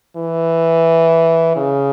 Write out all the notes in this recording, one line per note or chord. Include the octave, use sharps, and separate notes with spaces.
E3
C#3